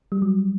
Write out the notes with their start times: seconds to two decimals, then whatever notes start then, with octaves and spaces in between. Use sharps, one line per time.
0.12 G3
0.22 F#3